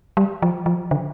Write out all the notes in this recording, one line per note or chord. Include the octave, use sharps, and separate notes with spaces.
G3
F3
F3
D3